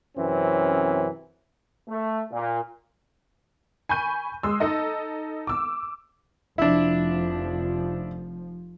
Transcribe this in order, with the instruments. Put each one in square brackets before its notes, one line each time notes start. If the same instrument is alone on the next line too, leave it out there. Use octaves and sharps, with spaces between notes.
[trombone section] F#2 C3 E3 C4 C#4
A3
A#2
[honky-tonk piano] G#5 B5 C#6 G6 D#7
G#3 C6 D#6 E6
D#4 A4 D#5
D6 E6
[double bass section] F1 F3 [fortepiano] D4 E4